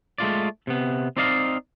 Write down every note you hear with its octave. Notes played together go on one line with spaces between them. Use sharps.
G#3 A3 F4 D5
C3 B3
C4 D#4 D5 D#5 F5